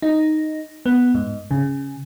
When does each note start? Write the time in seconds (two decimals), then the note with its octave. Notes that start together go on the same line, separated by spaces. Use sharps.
0.02 D#4
0.86 B3
1.15 G#2
1.51 C#3